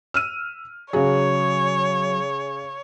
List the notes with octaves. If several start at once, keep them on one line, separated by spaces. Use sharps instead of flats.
E6 F6 D#7
C#3 F#3 G#4 C#5